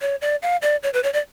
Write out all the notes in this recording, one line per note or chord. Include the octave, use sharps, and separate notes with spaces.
C#5
D5
F5
D5
C#5
B4
C#5
D5